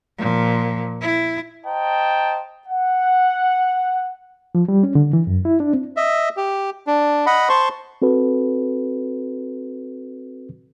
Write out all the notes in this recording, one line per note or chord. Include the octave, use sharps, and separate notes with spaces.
A#2 F3
E4
C5 D#5 G5 A5 A#5
F#5
F3
G3
C#4
D3
E3
F#2
E4
D4
C4
D#5 E5
G4
D4
D#5 F#5 B5
C5 A5 C6 C#6
C4 F#4 A4 B4